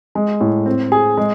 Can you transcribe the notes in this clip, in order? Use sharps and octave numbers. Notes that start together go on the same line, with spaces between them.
G#3
A2
C4
G#4
G#3